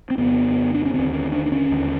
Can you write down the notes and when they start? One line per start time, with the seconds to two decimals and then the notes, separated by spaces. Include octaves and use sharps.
0.10 C4
0.18 F2 C#3 B3
0.74 D4
0.85 C#4
0.94 D#2 D3 C4
1.13 C#4
1.32 D4
1.46 D4
1.52 C#4
1.71 D#2 D3